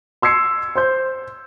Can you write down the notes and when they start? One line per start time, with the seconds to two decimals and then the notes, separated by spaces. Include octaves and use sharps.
0.22 C6 E6 G#6 C7 C#7
0.75 C5 C6 G6